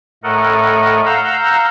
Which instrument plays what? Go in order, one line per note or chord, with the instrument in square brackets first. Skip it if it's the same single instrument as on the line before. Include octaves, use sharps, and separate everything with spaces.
[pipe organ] A2 A3 A4 A#4 D#5 F#5
F5 F#5 A#5 E6 G6